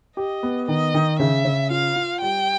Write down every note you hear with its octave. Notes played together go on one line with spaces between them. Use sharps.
G4 D#5
B3
D#3 D#5
D#3
C#3 E5
C#3
F4 F5
F4
G3 G5